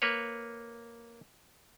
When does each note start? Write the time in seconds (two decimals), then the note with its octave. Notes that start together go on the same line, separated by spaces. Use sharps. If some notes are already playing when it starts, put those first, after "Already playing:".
0.02 A#3 B4 C#5